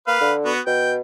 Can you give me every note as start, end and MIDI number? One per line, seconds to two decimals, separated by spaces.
0.07 0.19 58
0.07 0.32 71
0.07 0.32 77
0.21 0.52 50
0.45 0.60 59
0.45 0.60 66
0.67 1.00 47
0.67 0.92 79